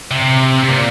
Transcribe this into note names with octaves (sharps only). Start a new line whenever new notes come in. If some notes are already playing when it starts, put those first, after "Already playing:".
C3
C3
A#2